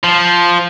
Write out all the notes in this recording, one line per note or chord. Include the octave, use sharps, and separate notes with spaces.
F3